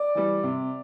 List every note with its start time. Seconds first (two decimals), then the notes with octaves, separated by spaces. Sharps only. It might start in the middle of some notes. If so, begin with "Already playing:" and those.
Already playing: D5 D6
0.15 E3 G3
0.43 C3